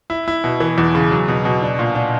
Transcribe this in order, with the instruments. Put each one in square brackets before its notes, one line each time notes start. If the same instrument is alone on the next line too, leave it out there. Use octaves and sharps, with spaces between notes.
[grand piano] E4
E4
B2
E3
E2
C#3
F#3
B2
B2
D4
A#2
D4